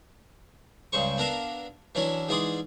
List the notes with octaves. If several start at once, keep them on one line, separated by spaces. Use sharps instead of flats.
C#2 G2 C#3 C5 C#6
B3 D4 A#4 E5 F5
E3 F#3 C#4 D4 E4
G#2 E3 G#4 D5 C6 D#6